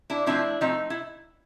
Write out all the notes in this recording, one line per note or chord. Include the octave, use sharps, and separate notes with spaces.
D4 E4
F3 A3 C4 D4 E4
F3 A3 C4 D#4
E4